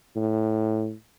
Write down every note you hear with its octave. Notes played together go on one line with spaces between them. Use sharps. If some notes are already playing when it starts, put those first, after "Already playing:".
A2